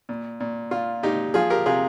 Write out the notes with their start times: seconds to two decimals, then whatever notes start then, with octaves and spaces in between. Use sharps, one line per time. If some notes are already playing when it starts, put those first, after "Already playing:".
0.09 A#2
0.40 A#2
0.71 A#2 F4
1.03 A#2 D#4 G4
1.34 F3 F4 G#4
1.50 G4 A#4
1.66 C3 F4 G#4